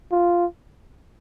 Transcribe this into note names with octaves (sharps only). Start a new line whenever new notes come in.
F4